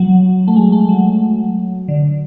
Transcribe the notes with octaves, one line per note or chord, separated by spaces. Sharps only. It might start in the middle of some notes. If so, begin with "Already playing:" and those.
Already playing: F#3
A3
G#3
A3
F#3
D3